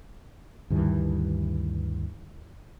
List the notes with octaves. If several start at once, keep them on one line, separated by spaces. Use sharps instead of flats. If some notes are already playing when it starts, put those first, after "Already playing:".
D2 G2 D#3 E3